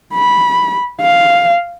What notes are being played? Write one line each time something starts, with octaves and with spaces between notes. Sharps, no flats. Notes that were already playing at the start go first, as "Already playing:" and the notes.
B5
F5